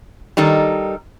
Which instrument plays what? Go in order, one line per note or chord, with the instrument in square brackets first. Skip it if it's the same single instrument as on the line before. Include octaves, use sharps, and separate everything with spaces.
[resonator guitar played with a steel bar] D#3 G3 D#4 A4